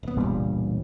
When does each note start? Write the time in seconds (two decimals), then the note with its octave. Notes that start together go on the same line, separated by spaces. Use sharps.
0.03 E1 B3
0.17 E1 C#2 G2 A#2 G3